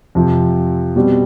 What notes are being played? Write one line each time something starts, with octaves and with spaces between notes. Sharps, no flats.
F2 C3 F3
B2 G3 C4